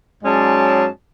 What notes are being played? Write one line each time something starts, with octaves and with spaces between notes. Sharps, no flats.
G#2 F#3 G#3 C#4 D5 A5